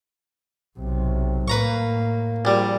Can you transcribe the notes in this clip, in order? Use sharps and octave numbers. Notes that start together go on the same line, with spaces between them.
B1 C3
A2 A#3 B4 A#5 C#6
A#1 G3